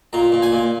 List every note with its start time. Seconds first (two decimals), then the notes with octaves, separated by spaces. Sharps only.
0.13 A#2 A#5
0.32 A#2
0.42 G#5
0.52 A#2